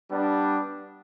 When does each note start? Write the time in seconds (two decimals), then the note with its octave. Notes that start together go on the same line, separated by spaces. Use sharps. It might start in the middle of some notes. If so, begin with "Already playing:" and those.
0.11 G3 B3 D4